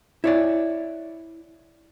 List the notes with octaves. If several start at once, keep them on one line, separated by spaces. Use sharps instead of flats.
E4 C#5 D5